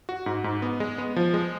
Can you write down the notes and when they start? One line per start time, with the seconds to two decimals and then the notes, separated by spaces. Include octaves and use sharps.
0.09 F#4
0.26 G#2
0.44 G#2
0.62 B3
0.80 G#3
0.98 B3
1.16 F3
1.34 G#3